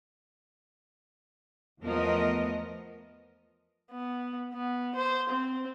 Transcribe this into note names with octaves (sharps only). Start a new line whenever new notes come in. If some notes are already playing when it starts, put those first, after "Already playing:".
E2 F3 A3 B3 A#4 D#5
B3
B3
C5
C4